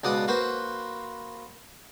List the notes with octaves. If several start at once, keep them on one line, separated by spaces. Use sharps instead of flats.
C#2 B2 D5 F#5 D#6
A#3 F#4 B4 C5